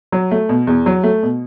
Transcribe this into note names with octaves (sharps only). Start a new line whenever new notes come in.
F#3
A3
B2
E2
F#3
A3
B2